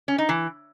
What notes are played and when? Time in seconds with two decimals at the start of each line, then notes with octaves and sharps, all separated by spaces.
0.08 C#4
0.18 D#4
0.29 E3